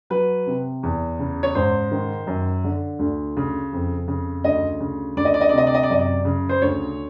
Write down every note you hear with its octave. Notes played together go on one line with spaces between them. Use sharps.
F#3 B4
C3
E2
C#3
C#5
G#2 C5
D#3
F#2
D3
D2
C#3
F2
C#3
D2 D#5
C#3
D2 D5
D#5
D5
D#5
D5
C3
D#5
D5
D#5
D5
F#2 D#5
D5
C#3
C5
D2 C#5